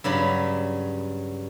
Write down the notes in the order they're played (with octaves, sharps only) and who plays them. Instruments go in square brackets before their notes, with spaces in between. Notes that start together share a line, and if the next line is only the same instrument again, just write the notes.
[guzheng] G2 C#3 F#3 B5